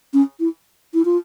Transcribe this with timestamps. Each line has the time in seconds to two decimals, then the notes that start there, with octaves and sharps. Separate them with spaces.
0.13 C#4
0.40 E4
0.94 E4
1.05 F4